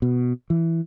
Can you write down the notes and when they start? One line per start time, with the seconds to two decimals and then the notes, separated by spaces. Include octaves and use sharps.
0.02 B2
0.50 E3